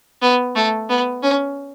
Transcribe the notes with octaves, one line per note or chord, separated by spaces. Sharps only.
B3
A3
B3
C#4